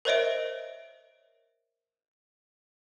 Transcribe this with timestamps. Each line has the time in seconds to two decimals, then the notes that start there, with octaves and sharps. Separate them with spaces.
0.05 A#4 C5 C#5 D#5 E5 D7